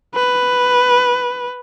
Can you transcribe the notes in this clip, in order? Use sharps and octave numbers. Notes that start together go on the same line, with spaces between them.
B4